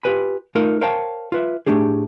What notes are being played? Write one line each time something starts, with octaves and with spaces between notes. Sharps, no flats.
F4 G4 G#4 B4 G#5 B5
A3 D#4 F4 A#4
A#4 C5 C#5 F5 G5 A5
F4 B4 E5
A2 A3 C4 D4 G4 G#4